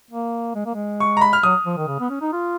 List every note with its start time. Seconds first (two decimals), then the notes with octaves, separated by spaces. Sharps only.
0.11 A#3
0.55 G#3
0.66 A#3
0.74 G#3
1.00 C#6
1.17 A#5
1.21 B5
1.33 F6
1.43 F#3 D#6
1.66 F3
1.77 D#3
1.88 C#3
2.00 B3
2.10 C#4
2.21 D#4
2.33 F4